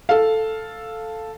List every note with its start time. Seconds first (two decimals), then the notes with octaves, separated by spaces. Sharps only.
0.09 A4 F5